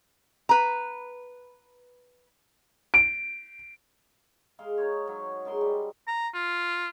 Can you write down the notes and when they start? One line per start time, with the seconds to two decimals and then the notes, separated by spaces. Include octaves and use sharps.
0.49 B4 A#5
2.94 D7
4.59 G#3 F5 C6
4.78 D#4 C5 C#5
5.08 F#3
5.45 F#2 G#3 A#4 C6
5.61 G3
6.08 A#5
6.34 F4